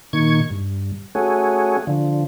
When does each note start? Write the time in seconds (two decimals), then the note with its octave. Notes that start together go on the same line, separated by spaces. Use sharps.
0.13 A#2 D#3 C#6 G#6
0.50 G2
1.15 A3 C#4 F#4 G#4
1.87 D3 F3